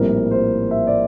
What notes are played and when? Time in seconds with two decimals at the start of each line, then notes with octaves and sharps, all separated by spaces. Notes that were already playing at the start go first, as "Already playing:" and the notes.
Already playing: A#1 A2 G3 C4 A#4
0.31 C5
0.71 E5
0.87 D5